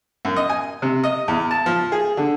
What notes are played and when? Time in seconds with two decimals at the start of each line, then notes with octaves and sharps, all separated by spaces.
0.25 F#2
0.36 D#5
0.49 G#5
0.82 C3
1.04 D#5
1.28 E2
1.51 A5
1.66 F3
1.92 G#4
2.17 D3